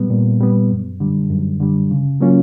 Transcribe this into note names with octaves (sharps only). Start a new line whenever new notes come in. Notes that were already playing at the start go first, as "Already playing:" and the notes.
Already playing: A#2 G3 B3
A#2
G3 B3
F#2
D3 G3
F#2
D3 G3
C#3
F#3 A#3 C#4 F4